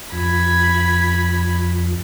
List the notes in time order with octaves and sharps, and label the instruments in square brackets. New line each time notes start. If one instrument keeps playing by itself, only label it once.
[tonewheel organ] F2 [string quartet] B5 G#6